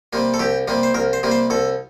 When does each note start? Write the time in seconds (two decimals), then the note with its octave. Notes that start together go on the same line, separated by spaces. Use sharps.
0.13 C3 G3 A#3
0.34 A4
0.39 C2 G4
0.68 C3 G3 A#3
0.83 C5
0.94 C2 A#4
1.13 C5
1.23 C3 G3 A#3
1.31 C5
1.50 C2 A4